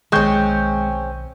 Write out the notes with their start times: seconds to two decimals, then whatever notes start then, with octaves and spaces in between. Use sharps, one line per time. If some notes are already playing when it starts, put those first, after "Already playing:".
0.12 B1 D#3 G#3 C4 C#4 G5 C#6 G6